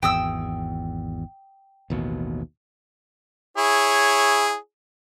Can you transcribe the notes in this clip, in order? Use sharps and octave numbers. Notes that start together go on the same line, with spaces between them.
G#1 E2 G5 D#6 E6
A1 D#2 B2
E4 G#4 C#5